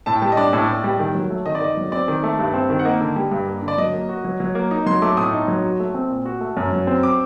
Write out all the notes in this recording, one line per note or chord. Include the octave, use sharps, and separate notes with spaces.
A2 A5
G5
G3 A5
D#5
D4 D5
A2
A2
G3
D#3
F#3
A3
D#3 D#5
D5
D#3 D#5
F#3
C4 D5
D#3
A3
G2
C4
D#3
F#5
A#3 D#5
D3
G3
G2
A#3
D3
D5
F#3 D#5
A#3
F#4
F#3
F#3
A#3
D#4 D#5
F#3 C6
A3 D6
A2 D#6
D#4
F#3
F#4
A3
C4
A#2
F#4
A3
F#2
F#3
C4
D6